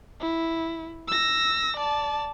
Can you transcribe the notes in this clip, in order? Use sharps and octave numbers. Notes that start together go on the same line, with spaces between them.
E4
E6 A#6
D5 A5